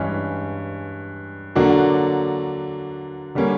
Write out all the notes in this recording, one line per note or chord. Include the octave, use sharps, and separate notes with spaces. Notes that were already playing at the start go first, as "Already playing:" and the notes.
Already playing: G2 E3 G#3 C#4
D3 F#3 A#3 D4 F#4
D3 G3 A#3 C#4